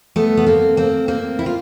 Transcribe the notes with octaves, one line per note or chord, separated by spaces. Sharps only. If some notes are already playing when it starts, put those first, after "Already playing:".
A3 B3
B3
A#3 C4
A#3 C4
A#3 C4
E4
F4